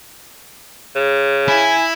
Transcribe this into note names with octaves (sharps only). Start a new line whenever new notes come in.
C#3
E4 G#5